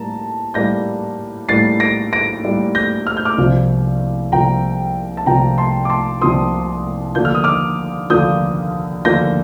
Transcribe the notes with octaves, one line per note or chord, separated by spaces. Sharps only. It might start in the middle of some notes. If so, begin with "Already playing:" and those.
Already playing: A2 G3 A#3 A5 A#5
A2 G3 A#3 G6 A#6
A2 G3 A#3 A6 C7
A#6 D7
A#6 D7
A2 G3 A#3
G6 A#6
F6
G6
D6 F6
C2 C3 F3 A#3
C2 C3 F3 A#3 G5 A#5
A5
C2 C3 F3 A#3 G5 A#5
A5 C6
D6
A5 C6
C2 C3 F3 A#3 C6 D#6
D#2 D3 F3 A#3 G6
F6
D#6
D6 F6
D#2 D3 F3 A#3 D#6 G6
D#2 D3 F3 A#3 G6 A#6